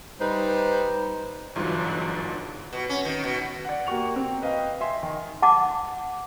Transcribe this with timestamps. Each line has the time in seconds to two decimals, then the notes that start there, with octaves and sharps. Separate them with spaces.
0.20 G3 D#4 B4 C5
1.56 G1 G#2 E3 F#3 D4 F4
2.73 B2
2.89 C#4
3.05 D#3
3.24 B2
3.65 D5 F#5
3.87 A#3 F#4 G4 C#6 F7
4.16 C4
4.42 B4 D#5 F5 G5
4.81 E5 G#5 C6
5.03 D#3
5.42 F#5 A5 D6